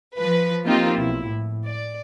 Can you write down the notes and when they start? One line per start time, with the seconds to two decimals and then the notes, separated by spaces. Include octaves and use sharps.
0.18 F3 B4
0.64 F3 A#3 C4 D#4 F4 G4
0.97 B1 E4
1.27 A2
1.69 D5